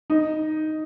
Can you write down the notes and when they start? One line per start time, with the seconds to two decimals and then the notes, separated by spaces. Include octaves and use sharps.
0.10 D#4